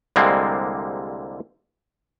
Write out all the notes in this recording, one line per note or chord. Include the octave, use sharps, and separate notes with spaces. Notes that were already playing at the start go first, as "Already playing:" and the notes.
C2 D3 G3 G#3 A#3 C4